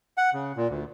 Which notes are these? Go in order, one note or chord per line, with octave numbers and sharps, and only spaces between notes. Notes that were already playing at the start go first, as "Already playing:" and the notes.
F#5
C#3
A#2
D2